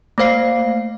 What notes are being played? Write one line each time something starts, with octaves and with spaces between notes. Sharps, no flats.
A3 A#3 C5 F5 C7